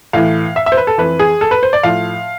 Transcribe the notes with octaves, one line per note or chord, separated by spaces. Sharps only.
A2 E3 F5
E5
E5
C5
B4
A4
F2 E3 B4
G#4
A4
B4
C5
D5
A2 F3 F5